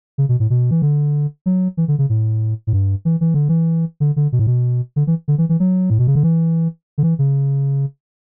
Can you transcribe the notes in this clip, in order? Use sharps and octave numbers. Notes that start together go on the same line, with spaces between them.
C#3
B2
A2
B2
E3
D3
F#3
E3
D3
C#3
A2
A2
G2
E3
E3
D3
E3
D3
D3
B2
A2
B2
D3
E3
D3
E3
E3
F#3
A2
B2
C#3
D3
E3
D3
E3
C#3